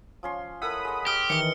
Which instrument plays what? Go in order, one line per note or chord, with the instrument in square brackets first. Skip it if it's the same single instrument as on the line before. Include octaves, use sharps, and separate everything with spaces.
[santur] F3 C#4 C6
[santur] E4 A4 A#4 [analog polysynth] F#5 B5 D#6
[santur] G#3 D#5
[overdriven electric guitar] G4 [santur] D#5 [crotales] F6 G7
[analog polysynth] D#3 E3 [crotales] C#7 G7